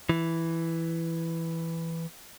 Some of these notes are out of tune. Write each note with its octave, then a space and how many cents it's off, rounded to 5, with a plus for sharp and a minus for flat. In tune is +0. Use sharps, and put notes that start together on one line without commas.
E3 +5